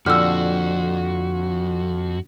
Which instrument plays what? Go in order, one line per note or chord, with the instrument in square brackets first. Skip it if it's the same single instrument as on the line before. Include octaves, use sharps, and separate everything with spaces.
[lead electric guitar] F2 [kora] A#2 D3 G4 [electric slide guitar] F#4 [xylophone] E6 F6